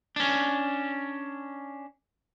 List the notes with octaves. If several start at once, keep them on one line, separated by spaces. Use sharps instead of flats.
C#4 D4